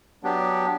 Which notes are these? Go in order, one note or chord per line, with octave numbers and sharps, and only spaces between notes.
F#3 B3 D4 G4